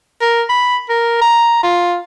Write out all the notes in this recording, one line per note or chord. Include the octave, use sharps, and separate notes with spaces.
A#4
B5
A#4
A#5
F4